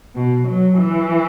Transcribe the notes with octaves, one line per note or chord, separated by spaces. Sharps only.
B2
F#3
E3